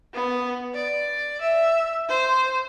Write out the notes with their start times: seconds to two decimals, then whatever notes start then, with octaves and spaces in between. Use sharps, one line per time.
0.14 B3
0.74 D5
1.41 E5
2.08 C5